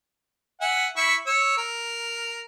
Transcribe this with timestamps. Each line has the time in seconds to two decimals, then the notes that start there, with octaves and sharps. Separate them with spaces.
0.61 E5 F#5 G#5
0.96 E4 E5 C#6
1.26 C#5 E6
1.57 A#4